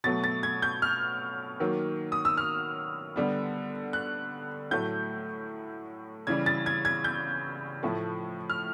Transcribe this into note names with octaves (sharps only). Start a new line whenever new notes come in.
B2 F#3 A3 A6
A6
G#6
G6
F6
D#3 F#3 A#3
D#6
E6
F6
D3 G3 B3
F#6
A2 F#3 A3 G6
C#3 E3 G3 G#6
A6
G#6
G#6
G6
A2 F3 A3
F6